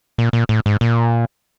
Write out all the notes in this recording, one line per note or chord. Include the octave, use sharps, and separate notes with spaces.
A#2
A#2
A2
G#2
A#2